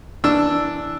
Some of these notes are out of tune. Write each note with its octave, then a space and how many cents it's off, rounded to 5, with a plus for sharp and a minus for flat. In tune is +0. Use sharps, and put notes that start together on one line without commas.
E3 -5 D4 +0 E6 +0